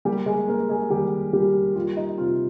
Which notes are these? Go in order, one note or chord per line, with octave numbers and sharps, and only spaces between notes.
G3 A#3 G4
G#3 G#4
A#3 A#4
G#3 G#4
D#3 G3 G4
G3 A#3 G4
G3 F4
D#4
C3 F4